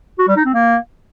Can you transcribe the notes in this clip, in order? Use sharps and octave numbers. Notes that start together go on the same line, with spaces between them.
F#4
G3
D#4
C4
A#3